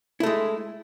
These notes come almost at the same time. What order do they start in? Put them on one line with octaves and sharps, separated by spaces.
E4 A3 G#3